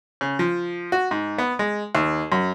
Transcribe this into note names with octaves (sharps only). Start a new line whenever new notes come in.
C#3
F3
F#4
G#2
B3
G#3
D#2
F#2